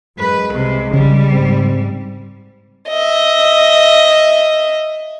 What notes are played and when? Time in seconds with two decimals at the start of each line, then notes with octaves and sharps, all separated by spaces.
0.19 F#2 G#3 B4
0.53 C2 C3
0.93 A#1 C#3 G3
1.32 G#2 C4
2.89 D#5 E5